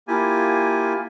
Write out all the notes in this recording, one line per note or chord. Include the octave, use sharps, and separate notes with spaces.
A#3 E4 F4 G4 G#5